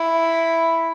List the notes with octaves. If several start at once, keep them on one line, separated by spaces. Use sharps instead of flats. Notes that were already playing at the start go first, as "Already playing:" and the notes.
Already playing: E4